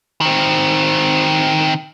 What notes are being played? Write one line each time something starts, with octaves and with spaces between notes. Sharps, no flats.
D#3 C4